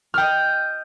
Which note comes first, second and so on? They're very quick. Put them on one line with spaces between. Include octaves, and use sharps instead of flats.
F6 G5 D#5